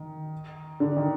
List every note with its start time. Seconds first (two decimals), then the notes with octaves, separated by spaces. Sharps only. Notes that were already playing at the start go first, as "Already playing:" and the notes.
Already playing: D#3
0.80 D3
0.97 D#3